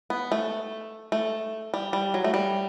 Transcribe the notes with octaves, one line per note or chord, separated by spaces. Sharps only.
B3
A3
A3
G3
G3
F#3
A3
G3